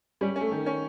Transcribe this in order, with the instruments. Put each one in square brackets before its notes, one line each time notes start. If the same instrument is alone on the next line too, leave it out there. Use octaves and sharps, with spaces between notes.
[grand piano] G3 [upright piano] C#4
[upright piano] C#4
[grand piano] A3
[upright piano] D#3
C#4